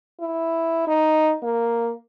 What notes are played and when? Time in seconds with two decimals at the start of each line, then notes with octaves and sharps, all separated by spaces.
0.20 E4
0.87 D#4
1.43 A#3